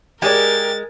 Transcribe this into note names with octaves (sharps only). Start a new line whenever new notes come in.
G#3 G4 G#4 A#4 D5 A6